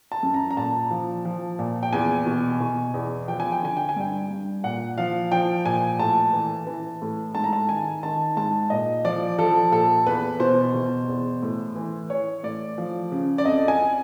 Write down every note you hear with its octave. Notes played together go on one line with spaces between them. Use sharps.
A5
F#2
A#5
A#5
A#2 A5
F3
F3
A#2
G5
E2 G#5
B2
B2
E2
F3 G5
G#5
G5
D3 G#5
G5
G#5
G2 G5
G2
A#2 F#5
F3 F5
F3 G5
A#2 G#5
A2 A5
E3
E3
A2
G#2 A5
A#5
A5
D#3 G#5
D#3 A5
G#2 A5
A#2 D#5
F3 D5
F3 A4
A#2 A4
E2 B4
B2 C5
B2
E2
A2
E3
E3 C#5
A2 D5
F3
C#3
D5
F2 D#5
G#5